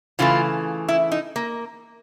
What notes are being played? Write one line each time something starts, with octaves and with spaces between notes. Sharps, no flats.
C#3 E3 A3 F4
E4
D#4
A#3